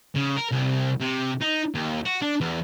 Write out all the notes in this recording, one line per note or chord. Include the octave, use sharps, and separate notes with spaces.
C#3
A#4
C2
C3
D#4
D#2
F#4
D4
E2